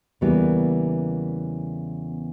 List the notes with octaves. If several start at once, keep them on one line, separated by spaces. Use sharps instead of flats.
E2 C#3 E3 G3 A#3 B3